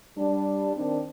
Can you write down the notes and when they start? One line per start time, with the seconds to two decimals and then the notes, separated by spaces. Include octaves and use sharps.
0.18 G3 D4
0.76 D#3 C4 D4